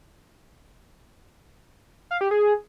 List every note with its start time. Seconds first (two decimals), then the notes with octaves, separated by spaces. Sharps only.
2.11 F5
2.21 G4
2.31 G#4